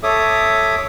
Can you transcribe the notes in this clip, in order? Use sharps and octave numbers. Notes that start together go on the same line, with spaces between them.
A4 C#5 E5 D6 D#6